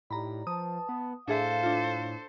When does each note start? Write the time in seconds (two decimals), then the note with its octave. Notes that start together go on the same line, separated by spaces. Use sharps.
0.10 A2 D#4 G4 D5 A#5 B5
0.47 F3 B4 A5 D#6
0.89 B3
1.28 A2 D4 G#4 A4 C5 E5 F5
1.63 D4 F4